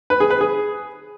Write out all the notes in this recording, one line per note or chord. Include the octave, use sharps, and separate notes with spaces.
B4
G#4
B4
G#4